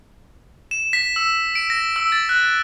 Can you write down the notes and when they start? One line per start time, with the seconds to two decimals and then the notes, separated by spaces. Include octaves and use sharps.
0.71 E7
0.93 B6
1.16 E6
1.55 D7
1.70 A#6
1.96 E6
2.12 A6
2.29 F#6